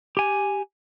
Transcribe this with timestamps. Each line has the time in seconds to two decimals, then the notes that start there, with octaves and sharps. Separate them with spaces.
0.17 G4 G#5